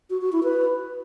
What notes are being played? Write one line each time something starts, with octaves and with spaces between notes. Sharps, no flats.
F#4
F#4
E4
B4